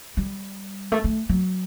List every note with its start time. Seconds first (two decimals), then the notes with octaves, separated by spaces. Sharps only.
0.17 G3
0.92 A3
1.04 A3
1.29 F#3